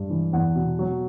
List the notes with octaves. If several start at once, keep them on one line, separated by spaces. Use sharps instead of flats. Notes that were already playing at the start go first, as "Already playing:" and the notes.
Already playing: G2
E3
E2 F#5
B2
F#3